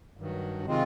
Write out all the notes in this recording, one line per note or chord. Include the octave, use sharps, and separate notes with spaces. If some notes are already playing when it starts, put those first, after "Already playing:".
G2 D#3 F#3
C3 D#3 G#3 C4 F4